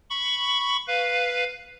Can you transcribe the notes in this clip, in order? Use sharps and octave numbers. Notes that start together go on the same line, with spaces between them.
B5 C#6
B4 F5